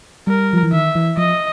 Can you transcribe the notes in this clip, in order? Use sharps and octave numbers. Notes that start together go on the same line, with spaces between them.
G3 A#4
F3
E3
D#3 E5
E3
F3 D#5